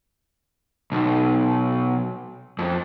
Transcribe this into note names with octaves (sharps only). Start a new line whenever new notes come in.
B1
F2